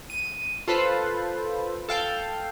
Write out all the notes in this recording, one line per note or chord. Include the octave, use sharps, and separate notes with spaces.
D#7
F4 A4 B4 C5
A4 F5 G5